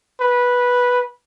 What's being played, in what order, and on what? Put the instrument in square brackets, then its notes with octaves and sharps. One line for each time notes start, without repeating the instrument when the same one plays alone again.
[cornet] B4